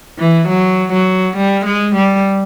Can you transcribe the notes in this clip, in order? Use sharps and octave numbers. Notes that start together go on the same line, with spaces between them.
E3
F#3
F#3
G3
G#3
G3